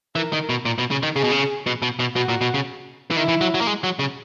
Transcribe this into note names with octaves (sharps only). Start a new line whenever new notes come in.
E3 A#4
D#3
B2
A#2
B2
C#3
D#3
C#3 G#4
B2
C#3
B2
B2
B2
B2 F#4
A#2
B2
C#3
E3
D#3 E4
E3
F#3
F#3
A#3
G#3
F#3
C#3